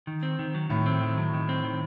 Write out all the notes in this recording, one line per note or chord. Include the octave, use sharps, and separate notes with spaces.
D#3
C4
D#3
F#3
A2 D#3
C4
D#3
F#3
D#3
C4
D#3